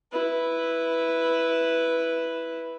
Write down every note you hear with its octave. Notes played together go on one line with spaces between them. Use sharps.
E4 B4